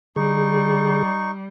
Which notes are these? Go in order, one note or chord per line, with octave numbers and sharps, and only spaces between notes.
D3 G3 D#4 G#4 C#6